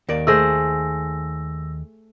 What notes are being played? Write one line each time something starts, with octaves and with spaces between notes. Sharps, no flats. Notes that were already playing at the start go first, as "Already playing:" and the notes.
D#2 A#4 D5
A3 G#4 C5 E6 A#6